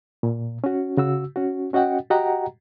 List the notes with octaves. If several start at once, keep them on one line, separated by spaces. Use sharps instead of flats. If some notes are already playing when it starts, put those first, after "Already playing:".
A#2
C#4 F#4
C#3 F#4 E6
C#4 F#4
C#4 F#4 D#5 F#5 G5
F#4 G4 D#5 F#5 G5 A#5